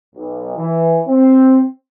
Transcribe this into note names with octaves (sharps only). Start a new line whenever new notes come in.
B1
E3
C4